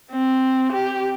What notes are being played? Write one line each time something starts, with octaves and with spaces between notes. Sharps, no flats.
C4
G4